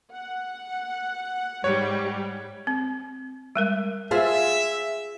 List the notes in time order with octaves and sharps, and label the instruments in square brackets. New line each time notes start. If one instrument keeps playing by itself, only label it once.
[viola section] F#5
[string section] G#2 G3 [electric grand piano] C#5
[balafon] C4
G3 G#3 A#4
[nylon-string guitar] F4 G#4 C5 [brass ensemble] E5